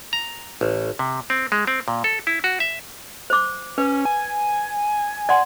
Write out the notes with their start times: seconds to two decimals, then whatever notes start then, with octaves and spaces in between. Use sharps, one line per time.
0.13 A#5
0.61 A1
0.99 C3
1.30 C4
1.52 G#3
1.67 C4
1.88 A#2
2.04 A4
2.27 E4
2.44 F#4
2.60 E5
3.30 C5 D6
3.78 C#4 B4
4.05 G#5
5.29 D5 F#5 C6